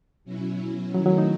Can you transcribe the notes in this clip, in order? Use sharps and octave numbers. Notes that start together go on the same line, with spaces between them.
B2 F#3 C#4 E4
D#3 F#3 A3 C#4 E4
F#3
D#4